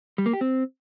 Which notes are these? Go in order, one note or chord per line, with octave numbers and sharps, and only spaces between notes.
G3
A#3
G4
C4